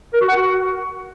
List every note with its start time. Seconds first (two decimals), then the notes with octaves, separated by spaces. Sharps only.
0.13 A#4
0.21 F#4
0.28 F#5
0.36 F#4